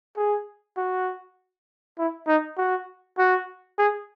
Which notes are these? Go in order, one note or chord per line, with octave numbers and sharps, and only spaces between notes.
G#4
F#4
E4
D#4
F#4
F#4
G#4